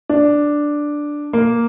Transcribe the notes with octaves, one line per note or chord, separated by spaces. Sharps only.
D4
A#3